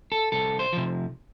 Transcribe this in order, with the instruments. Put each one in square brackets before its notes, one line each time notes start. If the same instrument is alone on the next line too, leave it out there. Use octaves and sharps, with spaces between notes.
[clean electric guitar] A4
C2 A4
C5
C3 F3